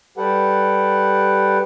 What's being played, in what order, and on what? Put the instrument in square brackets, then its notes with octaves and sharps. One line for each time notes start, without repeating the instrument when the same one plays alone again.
[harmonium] G3 G4 A4 B4 F#5